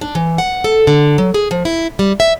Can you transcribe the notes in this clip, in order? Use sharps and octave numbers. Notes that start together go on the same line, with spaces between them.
D4
E3
F#5
A4
D3
F#3
G#4
F3
E4
G3
E5